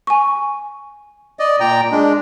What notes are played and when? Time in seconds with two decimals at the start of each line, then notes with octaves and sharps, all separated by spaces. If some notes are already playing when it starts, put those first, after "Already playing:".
0.07 G#5 C#6
1.39 D5 D#5
1.60 A#2 G5 A#5
1.92 G#3 D4